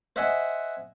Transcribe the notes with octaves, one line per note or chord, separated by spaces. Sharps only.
C5 D#5 E5 F#5 G#5 C6